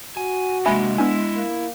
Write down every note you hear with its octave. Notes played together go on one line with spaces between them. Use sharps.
F#4 G#5
C3 G#3 A#3 D4 E5 G#5 B5
B3 D4 E4 G#5
A#3